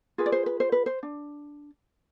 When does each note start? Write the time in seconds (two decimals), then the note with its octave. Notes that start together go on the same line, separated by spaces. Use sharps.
0.18 F4 G#4 B4
0.26 D5
0.32 C5
0.46 B4
0.60 C5
0.72 B4
0.86 C5
1.03 D4